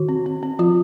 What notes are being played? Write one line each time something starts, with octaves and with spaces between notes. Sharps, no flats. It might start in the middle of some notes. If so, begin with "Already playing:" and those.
Already playing: D#3 F#4
C4
C4
C4
F3 F4